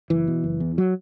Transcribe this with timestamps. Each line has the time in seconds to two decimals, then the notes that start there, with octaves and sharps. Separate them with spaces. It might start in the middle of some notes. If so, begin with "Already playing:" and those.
0.10 F#1 E3
0.28 B2
0.44 F#1
0.60 E2
0.78 F#3